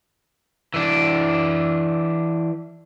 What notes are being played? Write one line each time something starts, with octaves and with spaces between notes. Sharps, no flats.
E3 D4